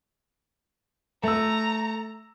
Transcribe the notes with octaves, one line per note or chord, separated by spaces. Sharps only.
A3 A#5 E6